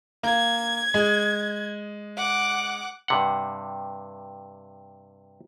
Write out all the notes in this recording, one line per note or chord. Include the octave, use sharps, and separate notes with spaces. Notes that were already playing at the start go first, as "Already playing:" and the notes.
A#3 G#6
G#3
F#5 D6
G2 C3 F#5